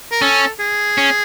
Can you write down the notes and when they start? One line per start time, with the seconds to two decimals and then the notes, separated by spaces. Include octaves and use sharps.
0.11 A#4
0.22 C#4 A4
0.60 G#4
0.98 C#4